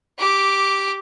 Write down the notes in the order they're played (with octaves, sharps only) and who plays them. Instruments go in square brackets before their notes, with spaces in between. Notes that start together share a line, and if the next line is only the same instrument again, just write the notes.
[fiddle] G4 D6